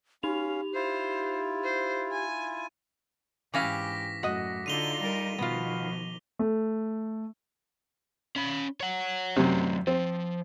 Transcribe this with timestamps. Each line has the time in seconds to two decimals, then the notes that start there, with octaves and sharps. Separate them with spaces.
0.23 C#4 D#4 G4 F5 F7
0.74 E4 F4 C5
1.64 C5
2.12 G#5
3.54 G#2 E3 C#4 G4 F5 D6 A#6 B6
4.23 F#2 A2 F#4 D#5
4.66 D3 D#4 F4 A4 D#7 F7 G7
4.99 G3 A#4
5.38 B2 D#3 F3 B3 F4
6.39 A3
8.36 C#4 B5
8.81 C#5 F#5
9.37 F#2 C3 F#3 A3
9.87 F3 C4